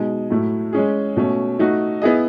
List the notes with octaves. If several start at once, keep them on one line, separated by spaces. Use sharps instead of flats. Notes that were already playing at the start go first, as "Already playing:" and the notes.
Already playing: B2 G#3 D#4
A2 F#3 A3 E4
G#3 C#4 G#4
B2 A3 C#4
A3 D#4 F#4
B3 E4 G#4 D#5